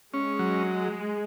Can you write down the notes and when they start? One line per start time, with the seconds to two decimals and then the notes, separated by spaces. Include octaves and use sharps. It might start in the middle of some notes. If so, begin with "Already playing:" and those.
0.14 G#3 C#4
0.39 F#3